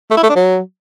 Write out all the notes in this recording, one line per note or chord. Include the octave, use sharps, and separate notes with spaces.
A3
E4
A3
D4
F#3